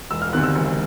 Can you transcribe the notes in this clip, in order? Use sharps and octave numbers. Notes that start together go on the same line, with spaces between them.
E1 E6
F6
D2 C3 D#3 F#6
E6
E1